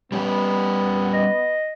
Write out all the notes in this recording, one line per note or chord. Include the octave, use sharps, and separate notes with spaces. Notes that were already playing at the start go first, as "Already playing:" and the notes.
G3 B3 C#4 G4
D#5